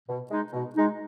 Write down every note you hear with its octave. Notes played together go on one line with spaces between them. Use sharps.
B2
G#3 D#4
B2
G#3 D#4